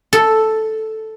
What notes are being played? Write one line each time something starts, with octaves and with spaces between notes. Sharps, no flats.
A4